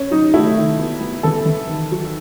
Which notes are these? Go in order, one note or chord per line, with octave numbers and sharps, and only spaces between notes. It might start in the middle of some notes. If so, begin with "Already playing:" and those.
Already playing: C#4
F#3 D#4
A3 E4
D#3
B3
B3
E3 A4
E3
D#3
F#3